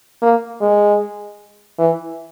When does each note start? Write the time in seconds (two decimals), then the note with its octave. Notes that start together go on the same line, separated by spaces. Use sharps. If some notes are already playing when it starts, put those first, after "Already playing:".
0.22 A#3
0.61 G#3
1.79 E3